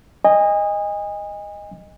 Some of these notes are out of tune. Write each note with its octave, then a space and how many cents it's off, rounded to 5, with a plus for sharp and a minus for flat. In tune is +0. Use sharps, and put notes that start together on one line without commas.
D#5 +0 G#5 -35